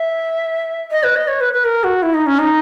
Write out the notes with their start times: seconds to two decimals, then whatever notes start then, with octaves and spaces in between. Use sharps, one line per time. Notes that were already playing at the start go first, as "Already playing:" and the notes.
Already playing: E5
0.91 D#5
1.03 B4
1.16 D#5
1.28 C#5
1.41 B4
1.53 B4
1.65 A#4
1.84 F#4
2.02 E4
2.14 D#4
2.26 C#4
2.39 D#4